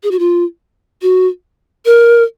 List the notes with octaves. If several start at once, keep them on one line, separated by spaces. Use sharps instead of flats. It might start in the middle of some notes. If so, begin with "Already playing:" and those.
G#4
F#4
F4
F#4
A#4